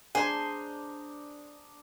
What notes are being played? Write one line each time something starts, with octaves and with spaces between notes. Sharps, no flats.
D4 G#4 C5 D#5 G#5 A#5